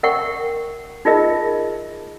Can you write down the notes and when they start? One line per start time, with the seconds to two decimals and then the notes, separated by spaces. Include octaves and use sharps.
0.03 A#4 E5 F#5 G5 C#6
1.05 D#4 F4 G#4 A#4 D#5 E5